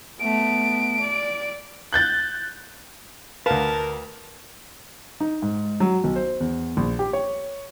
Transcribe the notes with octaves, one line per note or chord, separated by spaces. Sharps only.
A3 B3 D7
D5
F#6 G6 A6
D2 A#4 B4 F5 A5
D#4
G#2
F#3
B1
C5
E2
A#1
G4
C#5